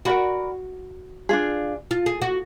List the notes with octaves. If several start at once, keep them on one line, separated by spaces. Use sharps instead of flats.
F#4 A#4 D5 F#5 B5
D4 F4 G#4
F4
G#4
F#4